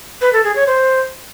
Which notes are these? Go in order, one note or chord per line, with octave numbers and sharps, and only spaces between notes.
B4
A4
G#4
C#5
C5